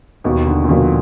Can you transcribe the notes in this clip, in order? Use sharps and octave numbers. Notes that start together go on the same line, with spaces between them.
D#2 B2
D3
A#2
B2 D3 F3 A#3